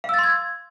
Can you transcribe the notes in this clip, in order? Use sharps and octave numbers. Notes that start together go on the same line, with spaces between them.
F5 C6 E6 G#6 A6